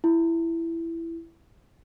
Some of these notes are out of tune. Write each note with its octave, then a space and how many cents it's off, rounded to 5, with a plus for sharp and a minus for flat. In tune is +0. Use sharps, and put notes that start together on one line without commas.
E4 +10